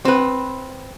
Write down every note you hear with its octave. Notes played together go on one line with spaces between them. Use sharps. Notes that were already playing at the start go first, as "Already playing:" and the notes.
C4 B4